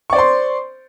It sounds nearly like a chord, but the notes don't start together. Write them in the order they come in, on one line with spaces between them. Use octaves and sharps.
C#6 D5 C5 C6